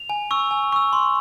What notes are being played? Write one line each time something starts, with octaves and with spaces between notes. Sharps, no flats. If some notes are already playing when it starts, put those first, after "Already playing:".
Already playing: F7
G#5
C#6 E6
G#5
C#6 E6
C6